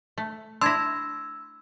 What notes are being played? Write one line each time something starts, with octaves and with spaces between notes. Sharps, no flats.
A3
D4 E4 C6 E6 G#6 A#6